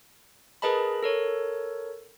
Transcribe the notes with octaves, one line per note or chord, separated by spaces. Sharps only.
G#4 A#4 B4 D#5 A5 B5
A4 A#4 C#5